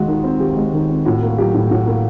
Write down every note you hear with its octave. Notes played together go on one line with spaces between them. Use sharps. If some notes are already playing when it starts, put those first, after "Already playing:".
Already playing: D#2 G#3 F#4
D#3
C4
D#2 G4
G#3
D#3
C4
A2 F#4
A#3
F#3 G4
A2
A2 F#4
A#3